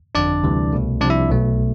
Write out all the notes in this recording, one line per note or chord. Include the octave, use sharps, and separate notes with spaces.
G1 F2 D3 D4 D5
D2 C3 E3 G3
C2 B2 A3
C2 C3 F3 D4 D5
E4 E5
B1 B2 A3